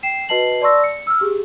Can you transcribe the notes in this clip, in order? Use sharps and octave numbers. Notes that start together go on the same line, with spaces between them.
G5 C7 E7
F#4 B4 D#5 A5 C7 F#7
D5 A5 C6 C#6 E6 A#6
C#7
E6 F6
G4 G#4